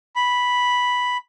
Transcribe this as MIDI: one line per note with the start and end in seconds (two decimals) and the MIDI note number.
0.16 1.17 83